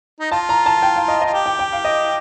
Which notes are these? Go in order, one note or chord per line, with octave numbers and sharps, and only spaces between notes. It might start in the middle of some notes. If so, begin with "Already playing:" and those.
D#4
F4 A5
A#5
A5
G5
F5
D#5
D#5
F4
G4
G5
G5
F5
D#5